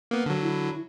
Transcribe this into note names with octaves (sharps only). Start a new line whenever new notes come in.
A#3 B3
D3 F#3
E4